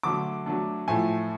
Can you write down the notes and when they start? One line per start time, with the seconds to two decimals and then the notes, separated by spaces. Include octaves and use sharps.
0.03 D3 F#3 A3 D6
0.46 F#3 A3 D4
0.88 A2 F3 A3 G#5